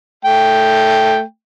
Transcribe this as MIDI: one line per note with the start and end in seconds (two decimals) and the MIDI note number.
0.25 1.22 57
0.25 1.22 79